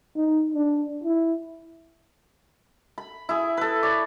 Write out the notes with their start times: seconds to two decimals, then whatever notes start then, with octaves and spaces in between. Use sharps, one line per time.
0.16 D#4
0.54 D4
1.04 E4
2.98 B5
3.29 E4 G#4
3.57 A4 B4
3.83 C#5 D5